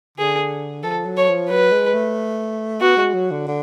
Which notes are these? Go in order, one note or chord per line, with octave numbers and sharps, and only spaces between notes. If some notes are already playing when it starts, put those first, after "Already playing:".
D3 G#4
F3 A4
F#3
C#5
F3
F#3 B4
G#3
A3
B3 F#4
G#3
F#3
D3
D3